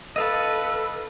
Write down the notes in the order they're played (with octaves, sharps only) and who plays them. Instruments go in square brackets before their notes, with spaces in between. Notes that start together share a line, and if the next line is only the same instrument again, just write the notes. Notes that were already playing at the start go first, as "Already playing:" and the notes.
[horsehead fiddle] A4 B4 [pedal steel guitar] D#5 F5 A5 [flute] E6